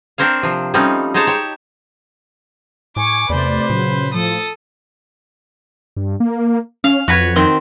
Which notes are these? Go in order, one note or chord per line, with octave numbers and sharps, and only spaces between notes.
C4 D4 A#4 C5 C#5 F5
C3 F3
F3 G3 A3 C4 C#4 D#4
G#3 D#4 C5 C#5 A5 A#5
G4 C#5
A2 G#5 C#6 D6
E2 C3 A3 B4 C5 D5
A#2 C#3 F#3
A2 F3 A4 D#6
G2
A#3
C#4 F5
F2 F#4 B4 C#5
D#3 C4